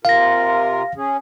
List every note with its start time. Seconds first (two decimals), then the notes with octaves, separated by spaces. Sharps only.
0.05 C3 F4 A#4 F5 A#6
0.97 C#4 G#4